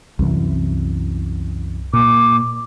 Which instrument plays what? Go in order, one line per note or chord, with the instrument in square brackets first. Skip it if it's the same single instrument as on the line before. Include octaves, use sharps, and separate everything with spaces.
[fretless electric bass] C2 F#2 E3
[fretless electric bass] A#2 [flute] D6